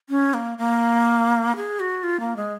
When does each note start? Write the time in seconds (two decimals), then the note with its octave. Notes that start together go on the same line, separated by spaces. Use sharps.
0.09 C#4
0.34 A#3
0.58 A#3
1.56 G#4
1.80 F#4
2.03 F4
2.20 A#3
2.36 G#3